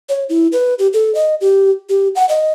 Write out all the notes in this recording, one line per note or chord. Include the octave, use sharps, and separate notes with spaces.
C#5
E4
B4
G4
A4
D#5
G4
G4
F#5
D#5